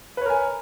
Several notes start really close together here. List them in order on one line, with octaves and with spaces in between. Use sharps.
B4 C#5 A#4 G#5